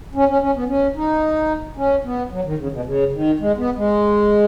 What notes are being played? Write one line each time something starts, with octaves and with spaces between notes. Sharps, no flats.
C#4
C#4
C#4
B3
C#4
D#4
C#4
B3
F#3
D#3
C#3
B2
C#3
D#3
G#3
B3
G#3